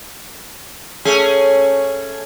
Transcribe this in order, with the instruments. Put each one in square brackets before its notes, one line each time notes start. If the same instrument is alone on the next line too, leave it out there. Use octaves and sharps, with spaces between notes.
[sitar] A3 C#4 G#4